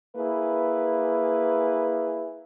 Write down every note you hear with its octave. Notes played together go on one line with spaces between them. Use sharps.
A#3 E4 G#4 B4